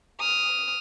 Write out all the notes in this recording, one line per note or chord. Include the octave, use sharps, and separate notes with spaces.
D#6 F6